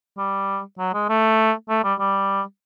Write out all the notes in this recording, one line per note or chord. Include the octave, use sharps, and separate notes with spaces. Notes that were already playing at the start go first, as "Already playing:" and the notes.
G3
F#3
G#3
A3
A3
G3
G3